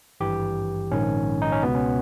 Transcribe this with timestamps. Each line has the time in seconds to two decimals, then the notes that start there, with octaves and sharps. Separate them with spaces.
0.20 G#1 G2 E3 G4
0.91 A#1 G#2 D#3 C#4
1.42 D#4
1.52 C#4
1.63 C#2 B2 B3
1.75 C#4